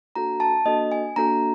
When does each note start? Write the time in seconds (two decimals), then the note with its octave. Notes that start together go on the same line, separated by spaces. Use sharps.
0.15 A#3 D4 F#4 A4 A#5
0.40 A5
0.65 A#3 D4 F#4 A4 D#5
0.92 G#5
1.16 A#3 D4 F#4 A4 A#5